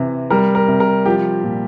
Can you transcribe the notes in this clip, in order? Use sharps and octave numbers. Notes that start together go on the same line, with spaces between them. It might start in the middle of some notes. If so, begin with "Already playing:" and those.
Already playing: C3 E3
G3 A#4
A#4
C3
A#4
F3 G4
A#2